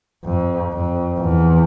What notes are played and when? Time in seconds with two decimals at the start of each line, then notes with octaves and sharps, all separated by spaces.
0.25 F2
0.72 F2
1.19 E2